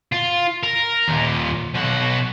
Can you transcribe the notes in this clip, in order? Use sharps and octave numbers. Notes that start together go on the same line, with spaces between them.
F4
A#4
D#2 A#2
B1 F#4